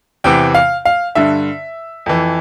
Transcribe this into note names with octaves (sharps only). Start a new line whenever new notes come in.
E2 C3 E3 G5
F5
F5
G2 D3 E5
F2 E3